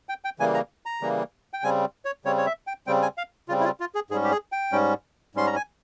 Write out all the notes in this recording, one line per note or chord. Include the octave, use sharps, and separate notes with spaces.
G5
G5
C#3 E3 G3 A#3 G#5
A#5
A#5
C#3 E3 G3 A#3
G5
C#3 G3 C4 G#5
C#5
C#3 G3 C4 C#5
C#5
E5
G5
C#3 G3 C4 G5
G#5
F5
C#3 G3 C4 F4
E4
F4
F4
G#4
G#2 G3 C#4 G#4
G4
G#4
G5
G#2 G3 C#4
G#2 G3 C#4 C6
A#5
G#5